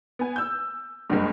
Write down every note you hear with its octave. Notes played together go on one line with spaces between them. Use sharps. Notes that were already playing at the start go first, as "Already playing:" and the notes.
B3 G#5
E6 G6
F#1 C#2 G2